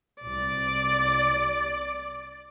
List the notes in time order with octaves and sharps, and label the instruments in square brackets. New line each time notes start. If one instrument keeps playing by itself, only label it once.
[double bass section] C2 [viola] D5